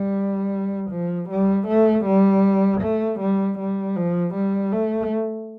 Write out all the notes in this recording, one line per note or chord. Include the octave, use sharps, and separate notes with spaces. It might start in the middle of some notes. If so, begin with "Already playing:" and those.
Already playing: G3
F3
G3
A3
G3
A3
G3
G3
F3
G3
A3